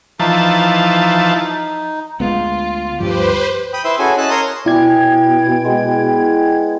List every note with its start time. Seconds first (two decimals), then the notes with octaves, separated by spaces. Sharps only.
0.20 E3 F3 D#4 A5
2.20 D2 G#3 B3 F4
3.00 D2 G2 F3 G4 B4 C5
3.73 G5 B5 D#6
3.84 E4 B4 C5 E5 C6 E6
3.99 C#4 E4 F#4 G#4 A4 G#5
4.18 C#4 D#5 A5 E6 F#6
4.30 A#4 C#5 A#5 C6 D#6
4.66 B2 E4 D5 G5 G#5 G#6
5.65 G#3 B3